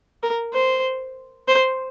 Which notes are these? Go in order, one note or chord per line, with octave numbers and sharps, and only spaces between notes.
A#4
C5
C5